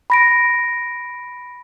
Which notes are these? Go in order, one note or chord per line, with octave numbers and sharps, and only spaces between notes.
B5 A#6 D7